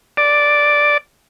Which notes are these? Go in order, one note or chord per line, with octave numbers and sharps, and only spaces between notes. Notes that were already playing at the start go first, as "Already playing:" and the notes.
D5